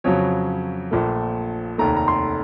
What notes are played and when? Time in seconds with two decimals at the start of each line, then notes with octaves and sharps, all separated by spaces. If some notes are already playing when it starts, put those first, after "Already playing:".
0.04 F2 C#3 F#3 C#5
0.91 A#1 A#2 A3
1.78 F1 D#2 D#3 A3 A#5
1.97 A#5
2.08 C6